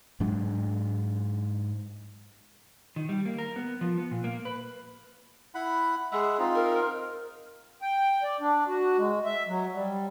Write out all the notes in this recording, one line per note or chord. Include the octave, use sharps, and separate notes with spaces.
G#2 F#3 G#3 D4
D#3
G3
A#3
A#4
B3
F3
B3
A#2
A#3
B4
E4 F#5 B5
G#3 G#4 E5 F#5
C4 D#4 F4
A#4
G5
D5
D4
F#4
G#3
E5
F#3
G3